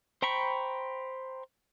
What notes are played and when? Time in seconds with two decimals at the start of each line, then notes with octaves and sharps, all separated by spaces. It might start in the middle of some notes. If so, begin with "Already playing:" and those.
0.22 C5 G5 A#5 B5 C#6